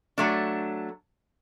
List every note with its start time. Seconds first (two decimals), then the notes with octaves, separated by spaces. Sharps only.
0.18 F#3 A3 D4